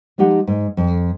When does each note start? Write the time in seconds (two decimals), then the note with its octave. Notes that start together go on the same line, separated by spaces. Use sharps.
0.18 F3 G#3 D#4 G4 F#5
0.47 G#2
0.77 F2